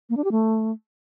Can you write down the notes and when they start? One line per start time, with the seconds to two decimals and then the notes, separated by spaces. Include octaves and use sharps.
0.10 A#3
0.17 D4
0.24 G4
0.32 A3